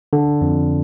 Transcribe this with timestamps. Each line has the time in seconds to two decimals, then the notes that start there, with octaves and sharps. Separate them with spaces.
0.13 D3
0.41 F2